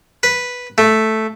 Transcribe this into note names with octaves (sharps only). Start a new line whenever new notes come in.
B4
A3